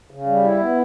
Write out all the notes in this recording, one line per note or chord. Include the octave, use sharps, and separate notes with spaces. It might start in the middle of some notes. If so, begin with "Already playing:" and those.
C#3
G3
E4
B3